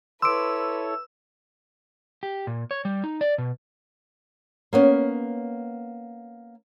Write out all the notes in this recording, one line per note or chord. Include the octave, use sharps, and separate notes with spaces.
E4 A4 B4 C#5 C6 D6 E6 D7
G4
A#2
C#5
G3
D#4
D5
B2
A#3 B3 C#4